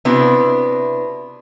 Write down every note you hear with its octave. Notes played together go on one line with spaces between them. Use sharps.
C3 B3 D4 E4 F#4